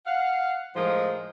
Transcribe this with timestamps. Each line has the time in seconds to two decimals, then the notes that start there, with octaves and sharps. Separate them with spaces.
0.06 F5 F#5
0.76 A2 F3 G#3 D#4 F4 A#4